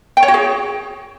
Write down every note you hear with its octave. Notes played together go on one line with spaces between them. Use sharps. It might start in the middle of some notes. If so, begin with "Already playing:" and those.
G5
C#5
F#4
G#4